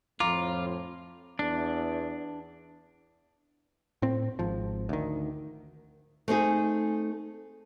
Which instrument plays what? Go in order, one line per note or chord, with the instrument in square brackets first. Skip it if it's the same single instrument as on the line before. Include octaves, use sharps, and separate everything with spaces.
[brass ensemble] F2 A2 [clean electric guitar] F4 [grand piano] A#5 [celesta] D6
[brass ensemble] E2 [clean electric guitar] D4
[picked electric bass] A2 C4
G#1 F3
D2 D#3
[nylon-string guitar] A3 C4 D#4 G#4